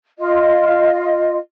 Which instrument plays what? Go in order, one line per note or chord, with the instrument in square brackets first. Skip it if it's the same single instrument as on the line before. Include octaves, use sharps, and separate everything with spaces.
[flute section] F4 D#5